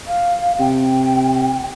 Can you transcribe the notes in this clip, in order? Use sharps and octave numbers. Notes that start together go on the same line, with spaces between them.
F5
C3 G5